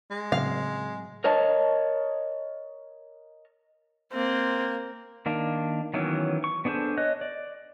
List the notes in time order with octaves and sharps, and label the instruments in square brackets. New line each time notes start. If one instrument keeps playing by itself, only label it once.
[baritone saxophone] G#3
[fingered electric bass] A2 F#3 C4 [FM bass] C#3 [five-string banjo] F5
[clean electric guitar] A#4 C#5 D#5 A5
[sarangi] A#3 [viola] C4
[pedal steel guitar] D#3 A#3 D4
D#3 E3 F#3 B3 C#4
C#6
B3 D4 G#4 A4 C5
C#5 D#5 F#6
D5